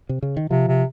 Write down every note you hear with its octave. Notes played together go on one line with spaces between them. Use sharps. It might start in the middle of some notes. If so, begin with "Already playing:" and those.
C3
C#3
D#3
C3 F3
C3